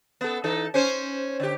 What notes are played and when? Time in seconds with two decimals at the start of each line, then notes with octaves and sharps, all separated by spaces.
0.21 B3 A4
0.44 E3 D#4 A4
0.74 C#4 C5 C#5
1.40 D3 G4